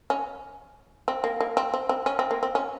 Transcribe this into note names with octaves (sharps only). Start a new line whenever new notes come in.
C#4
C4
A#3
A#3
C4
C4
C4
C#4
C4
A#3
C4
C#4